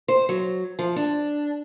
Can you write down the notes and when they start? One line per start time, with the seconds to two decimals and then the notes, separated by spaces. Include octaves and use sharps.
0.08 C5
0.29 F#3
0.79 F3
0.96 D4